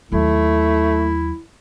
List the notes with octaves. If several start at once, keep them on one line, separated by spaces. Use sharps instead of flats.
D#2 F#3 A3 E4